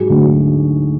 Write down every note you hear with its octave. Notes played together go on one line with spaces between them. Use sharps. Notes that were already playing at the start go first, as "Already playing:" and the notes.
Already playing: G#2 F#3 F#4 G#4
D2